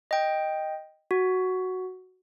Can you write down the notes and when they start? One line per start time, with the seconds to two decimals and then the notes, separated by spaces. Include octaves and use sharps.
0.11 D#5 G5
1.11 F#4